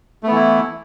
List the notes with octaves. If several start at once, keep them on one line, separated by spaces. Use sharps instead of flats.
E3 A3 B3 E4